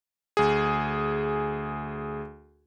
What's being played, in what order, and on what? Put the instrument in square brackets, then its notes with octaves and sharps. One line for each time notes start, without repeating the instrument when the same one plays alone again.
[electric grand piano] D2 G#4